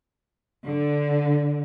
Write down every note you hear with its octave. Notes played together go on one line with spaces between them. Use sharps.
D3